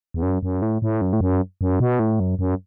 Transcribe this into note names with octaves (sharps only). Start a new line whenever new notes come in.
E2
F#2
F#2
A2
A2
F#2
A2
F#2
F#2
B2
A2
F#2
F#2